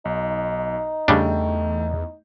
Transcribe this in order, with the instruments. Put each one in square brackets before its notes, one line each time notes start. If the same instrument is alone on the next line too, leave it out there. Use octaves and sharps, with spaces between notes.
[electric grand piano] B1 [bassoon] D#4
[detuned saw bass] E2 [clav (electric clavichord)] C#3 G3 D4 [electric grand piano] A3 G5